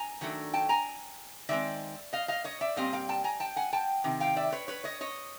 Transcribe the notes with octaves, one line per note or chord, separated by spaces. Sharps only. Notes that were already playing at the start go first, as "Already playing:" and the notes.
Already playing: G#5 A#5
D#3 F#3 A3 D4
G5 A5
G#5 A#5
D#3 G#3 C4 D5 E5
D#5 F5
D#5 F5
C#5 D#5
D5 E5
A#2 G3 C4 D#5 F5
F5 G5
G5 A5
G#5 A#5
G5 A5
F#5 G#5
G5 A5
C3 D#3
F5 G5
D5 E5
B4 C#5
B4 C#5
C#5 D#5
C#5 D#5